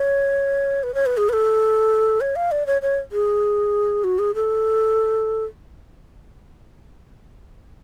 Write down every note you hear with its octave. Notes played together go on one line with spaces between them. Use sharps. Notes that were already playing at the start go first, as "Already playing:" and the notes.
Already playing: C#5
B4
C#5
B4
G#4
B4
A4
C#5
F5
D5
C#5
C#5
G#4
F#4
G#4
A4